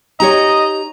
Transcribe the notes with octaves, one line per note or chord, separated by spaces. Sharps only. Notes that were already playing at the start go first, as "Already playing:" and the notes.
D#4 G4 C#5 D#5 A#5